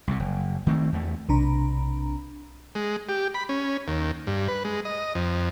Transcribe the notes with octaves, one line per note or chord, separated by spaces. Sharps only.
C2 C3
F#1
D#3 A3 C4
E2 A3
B1 C3 D4 A#5 B5
G#3
G4
B5
C#4
D#2
G2
B4
G#3
D#5
F2